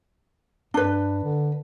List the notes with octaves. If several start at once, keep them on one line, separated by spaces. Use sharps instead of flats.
G2 D4 B4
D3